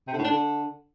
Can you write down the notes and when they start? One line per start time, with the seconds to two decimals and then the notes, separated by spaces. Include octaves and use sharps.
0.07 C3
0.13 D3
0.19 A2
0.24 D4
0.30 D3